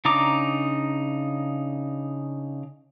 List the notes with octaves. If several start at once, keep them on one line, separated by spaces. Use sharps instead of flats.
C#3 D4 D#4 A#5 D6